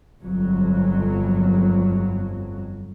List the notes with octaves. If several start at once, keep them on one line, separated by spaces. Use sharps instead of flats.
G1 F2 F#3